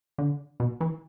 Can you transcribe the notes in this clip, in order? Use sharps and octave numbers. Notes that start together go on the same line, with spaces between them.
D3
B2
E3